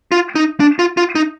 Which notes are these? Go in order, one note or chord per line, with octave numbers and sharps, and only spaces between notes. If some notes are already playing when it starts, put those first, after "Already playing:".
F4
D#4
D4
F4
F4
D#4